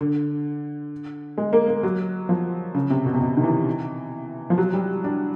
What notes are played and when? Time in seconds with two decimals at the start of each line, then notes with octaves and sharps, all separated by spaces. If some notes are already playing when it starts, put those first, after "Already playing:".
0.01 D3
1.38 G#3
1.53 A#3
1.68 A#3
1.83 F#3
2.29 F3
2.75 C#3
2.90 C3
3.06 B2
3.14 C3
3.21 B2
3.37 D#3
3.43 E3
4.50 F3
4.58 F#3
4.74 G3
5.04 D4